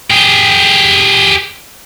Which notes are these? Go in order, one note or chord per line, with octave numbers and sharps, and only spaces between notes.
G4 G#4